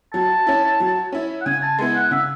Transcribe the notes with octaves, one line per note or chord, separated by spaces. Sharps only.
F#3 A5
C#4 E4
F#3
C#4 E4
F#5
C#3 G#5
A5
G#3 B3 E4 G#5
F#5
C#3 E5